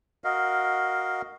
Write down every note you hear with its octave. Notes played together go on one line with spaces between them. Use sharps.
F#4 A#4 D#5 F5